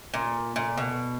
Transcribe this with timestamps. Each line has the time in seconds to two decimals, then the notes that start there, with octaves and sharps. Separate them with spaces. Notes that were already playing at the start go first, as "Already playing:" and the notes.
0.14 A#2
0.56 A#2
0.77 B2